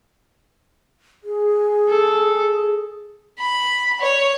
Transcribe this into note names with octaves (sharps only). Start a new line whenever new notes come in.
G#4
A4
B5
C#5